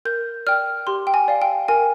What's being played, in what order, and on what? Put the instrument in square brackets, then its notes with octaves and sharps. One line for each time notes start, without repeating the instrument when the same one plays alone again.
[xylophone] A#4 G6
D5 G5 F6
G4 C6
G5
G#5
D5 F5
G5
A#4 G#5